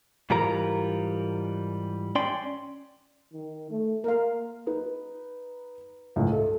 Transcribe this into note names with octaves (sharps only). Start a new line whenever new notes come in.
G#2 E3 G3 F4 A#4 A#5
C#4 D5 G5 C6
D#3
A3
A#3 A#4 F5
D#4 B4
C#2 A2
A4